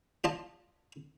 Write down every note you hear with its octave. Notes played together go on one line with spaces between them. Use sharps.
F4 D#5 A5